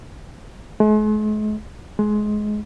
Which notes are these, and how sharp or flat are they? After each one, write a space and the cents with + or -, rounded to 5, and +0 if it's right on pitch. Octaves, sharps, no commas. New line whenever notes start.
G#3 +45
G#3 +20